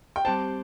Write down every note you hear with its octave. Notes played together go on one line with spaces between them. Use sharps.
G5
G3 C4 G4 C5 A5